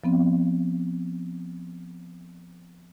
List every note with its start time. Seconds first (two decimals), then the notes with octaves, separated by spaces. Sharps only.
0.04 F3 B3 C4